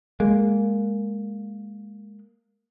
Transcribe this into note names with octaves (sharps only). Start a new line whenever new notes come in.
G#3 A#3